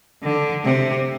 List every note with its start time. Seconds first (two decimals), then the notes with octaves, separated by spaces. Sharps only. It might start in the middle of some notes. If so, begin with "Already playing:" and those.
0.23 D3
0.64 C3